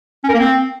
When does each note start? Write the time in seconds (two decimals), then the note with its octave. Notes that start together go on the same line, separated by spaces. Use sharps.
0.24 C#4
0.29 A#4
0.34 A#3
0.39 C4